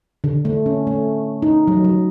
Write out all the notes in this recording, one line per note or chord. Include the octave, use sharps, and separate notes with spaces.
D3
A3
C#4
A3
D#4
F#3
F#3